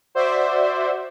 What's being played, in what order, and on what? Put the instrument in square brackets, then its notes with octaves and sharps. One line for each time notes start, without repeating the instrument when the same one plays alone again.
[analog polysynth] F#4 C5 D5 E5